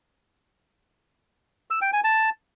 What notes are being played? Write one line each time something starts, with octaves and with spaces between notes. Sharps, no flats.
E6
G5
G#5
A5